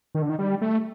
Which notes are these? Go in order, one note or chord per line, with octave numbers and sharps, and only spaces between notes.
D#3
D3
D#3
G3
A3